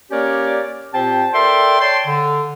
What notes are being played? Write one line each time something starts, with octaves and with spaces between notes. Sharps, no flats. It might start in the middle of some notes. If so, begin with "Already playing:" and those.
A#3 C#4 G4 A#4 C#5 D5
A#2 C4 G4 C5 G5 A5
A4 A#4 D5 E5 G5 C6
C#5 D5 G5 A5 C6
D3